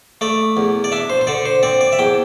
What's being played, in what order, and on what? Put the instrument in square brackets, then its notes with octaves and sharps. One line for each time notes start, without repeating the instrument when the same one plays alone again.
[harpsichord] A3 D5
E2
D5
D4 E5
C5
C5
D3 D5
C5
C4 D5
D5
E5
E2 G5